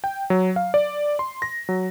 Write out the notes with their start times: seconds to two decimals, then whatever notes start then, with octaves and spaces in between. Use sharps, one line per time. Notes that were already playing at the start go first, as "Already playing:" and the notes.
0.04 G5
0.30 F#3
0.56 F5
0.74 D5
1.19 C6
1.42 A#6
1.69 F#3